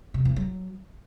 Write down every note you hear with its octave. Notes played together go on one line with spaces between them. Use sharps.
C3
E2
F#3